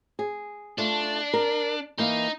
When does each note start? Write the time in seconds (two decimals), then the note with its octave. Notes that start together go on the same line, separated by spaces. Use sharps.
0.19 G#4
0.78 A3 D4 F4
1.33 A#4
1.98 E3 A#3 D#4 F5